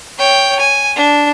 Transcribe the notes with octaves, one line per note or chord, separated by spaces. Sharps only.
C#5 G5
G#5
D4